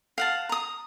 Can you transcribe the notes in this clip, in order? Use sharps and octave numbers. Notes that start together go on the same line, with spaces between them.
F5 F#5 A5
A#5 D#6